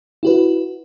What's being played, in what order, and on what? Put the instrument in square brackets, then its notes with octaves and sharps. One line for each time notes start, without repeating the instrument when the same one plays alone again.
[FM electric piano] E4 F#4 B4